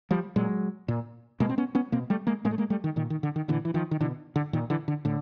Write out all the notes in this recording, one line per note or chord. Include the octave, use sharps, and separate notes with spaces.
F3 G3
A#2 F#3 G#3
A#2
B2 G#3 A#3
C4
B3 C#4
B3 C#4
B2 A#3 C4
G3 A3
G#3 A#3
A2 G#3 A#3
A3
G#3 A#3
G3 A3
D#3
A#2 D#3
D#3
D3
D#3
A#2 D3 E3
E3
D#3 F3
D#3
B2 D3 E3
D3
A#2 D#3
D3 E3
D3
A2 D3